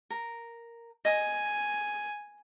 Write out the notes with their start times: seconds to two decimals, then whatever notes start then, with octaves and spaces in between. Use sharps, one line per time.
0.10 A#4
1.05 D#5 G#5 D#6